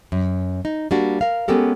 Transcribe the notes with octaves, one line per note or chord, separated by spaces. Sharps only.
F#2
D#4
G3 A#3 D4 F#4
A#4 F5
G#3 B3 C#4 G4 A4 A#4